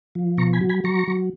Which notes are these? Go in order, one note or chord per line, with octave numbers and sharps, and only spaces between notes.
F3
B2 A#5 C#6
G#5 B5
F#3
G#5 B5
F#3 A#5 C#6
F#3